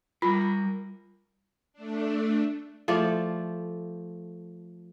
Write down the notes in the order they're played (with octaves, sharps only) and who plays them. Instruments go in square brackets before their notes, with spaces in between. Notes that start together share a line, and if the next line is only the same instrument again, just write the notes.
[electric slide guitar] G3 A#4 [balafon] F4
[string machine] A3 D4
[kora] F3 A3 D5